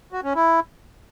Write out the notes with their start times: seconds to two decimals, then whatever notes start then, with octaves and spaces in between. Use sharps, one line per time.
0.12 F#4
0.24 C#4
0.35 E4